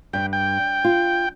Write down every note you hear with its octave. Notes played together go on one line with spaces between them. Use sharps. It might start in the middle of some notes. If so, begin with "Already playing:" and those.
G2 G5
G5
F4